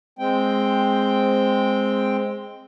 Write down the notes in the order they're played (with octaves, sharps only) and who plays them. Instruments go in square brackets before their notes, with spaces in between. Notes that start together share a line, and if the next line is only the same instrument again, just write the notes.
[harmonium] G#3 C4 G5